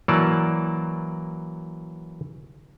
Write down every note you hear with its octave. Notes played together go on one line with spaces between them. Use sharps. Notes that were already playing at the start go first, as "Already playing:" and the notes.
E3 F#3 A#3 D5 A5